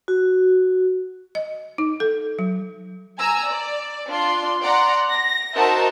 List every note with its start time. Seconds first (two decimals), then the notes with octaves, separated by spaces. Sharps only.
0.08 F#4
1.35 D#5
1.78 D#4
2.00 A4
2.39 F#3
3.19 G#5 A#5 E6
3.48 D5
4.09 D4 F4 D5 C6
4.63 D5 F#5 A#5 C6
5.10 A#6
5.56 D#4 F#4 A#4 C5 E5 A5